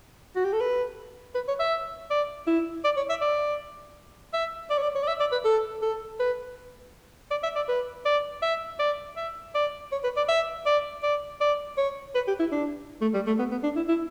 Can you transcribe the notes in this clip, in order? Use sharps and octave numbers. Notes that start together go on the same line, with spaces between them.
F#4
G4
A4
B4
B4
C#5
E5
D5
E4
D5
C#5
E5
D5
E5
D5
C#5
D5
C#5
D5
E5
D5
B4
A4
A4
B4
D5
E5
D5
B4
D5
E5
D5
E5
D5
C#5
B4
D5
E5
D5
D5
D5
C#5
B4
G4
E4
D4
A3
G3
A3
B3
B3
D4
E4
E4